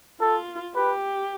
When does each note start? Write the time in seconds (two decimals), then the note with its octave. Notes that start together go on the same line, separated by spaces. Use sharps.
0.20 F4 A4
0.75 G4 B4